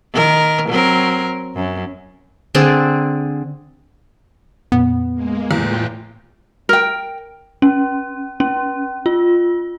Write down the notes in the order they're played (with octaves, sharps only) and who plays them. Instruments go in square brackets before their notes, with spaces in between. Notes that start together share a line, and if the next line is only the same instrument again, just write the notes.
[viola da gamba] D#3 A#4
F#3 C4 A#4
F#2
[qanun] D3 C4 G#4 D5
[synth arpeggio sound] F2 A#2 [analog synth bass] B3
[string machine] G#3 A#3
[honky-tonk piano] E2 [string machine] A2 F4 G5
[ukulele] A#4 G5
[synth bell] C#4
C#4
F4